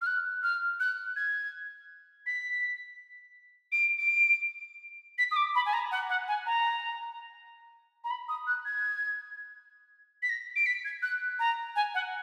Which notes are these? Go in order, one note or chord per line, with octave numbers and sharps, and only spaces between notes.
F6
F#6
F6
F#6
G#6
B6
D7
D7
B6
D#6
D6
B5
G#5
A#5
F#5
F#5
G#5
A#5
A#5
B5
D#6
F#6
G#6
B6
A#6
D7
B6
G#6
F#6
A#5
G#5
F#5